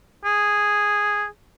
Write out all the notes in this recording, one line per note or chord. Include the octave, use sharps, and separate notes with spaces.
G#4